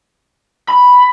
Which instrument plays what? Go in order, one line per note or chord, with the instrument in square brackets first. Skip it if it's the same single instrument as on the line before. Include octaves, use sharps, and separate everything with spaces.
[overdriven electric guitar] B5